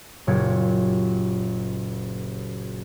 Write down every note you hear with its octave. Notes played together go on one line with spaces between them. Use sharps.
F#1 A#2 G4 C#5